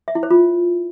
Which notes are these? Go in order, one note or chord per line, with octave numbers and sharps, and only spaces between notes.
E5
E4
C5
F4